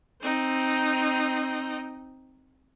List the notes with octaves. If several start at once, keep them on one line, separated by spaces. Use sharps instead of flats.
C4 D#4